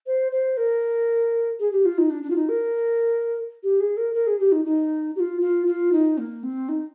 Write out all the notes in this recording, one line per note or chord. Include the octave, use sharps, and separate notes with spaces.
C5
C5
A#4
G#4
G4
F4
D#4
D4
D4
F4
D#4
A#4
G4
G#4
A#4
A#4
G#4
G4
D#4
D#4
G4
F4
F4
F4
D#4
A#3
C4
D#4